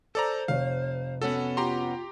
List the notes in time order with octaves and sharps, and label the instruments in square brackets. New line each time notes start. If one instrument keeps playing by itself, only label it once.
[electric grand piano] A4 D5 A#5 [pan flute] C5
[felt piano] F1 C#5 [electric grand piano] F5
[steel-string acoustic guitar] B3 C#4 F#4 [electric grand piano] A4
[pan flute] F4 [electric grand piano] G4 A#5 C6